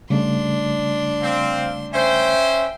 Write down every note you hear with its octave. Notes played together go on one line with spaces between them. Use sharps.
C#3 G3 A3 D4 C6
C4 F5
C#4 C5 E5 G5